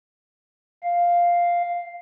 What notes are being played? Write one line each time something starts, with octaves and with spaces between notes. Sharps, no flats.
F5